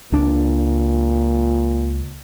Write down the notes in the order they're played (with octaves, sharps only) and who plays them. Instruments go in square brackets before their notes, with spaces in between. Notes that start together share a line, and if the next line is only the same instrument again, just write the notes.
[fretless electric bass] C#2 D4 [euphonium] A#2